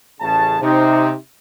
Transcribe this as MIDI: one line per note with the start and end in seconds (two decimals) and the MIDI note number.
0.20 0.57 33
0.20 0.57 49
0.20 0.57 81
0.61 1.11 48
0.61 1.16 63